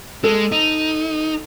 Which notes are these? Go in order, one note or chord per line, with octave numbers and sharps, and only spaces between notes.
G#3 A4
D#4